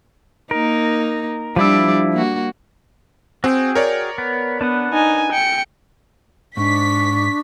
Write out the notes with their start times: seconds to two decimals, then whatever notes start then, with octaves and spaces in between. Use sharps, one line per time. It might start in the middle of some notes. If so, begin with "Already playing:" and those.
0.51 A#3 D#4 A#4
1.56 F3 G3 D4 E4 D5 E6
2.13 A#3 F#4
3.44 C4 F#4 G#4 G5
3.75 A#4 C#5 D5
4.18 B3
4.61 B3 D4 B4 F#5
4.94 D#4 G#5
5.33 G5 C#7
6.57 G#2 D4 C#6 B6